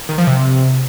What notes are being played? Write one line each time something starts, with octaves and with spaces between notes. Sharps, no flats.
D#3
F3
C3